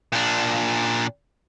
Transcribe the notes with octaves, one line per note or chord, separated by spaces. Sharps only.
A#2 D4